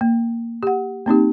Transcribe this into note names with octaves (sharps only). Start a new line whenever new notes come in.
A#3
G4 F#5
A#3 C4 D#4 G4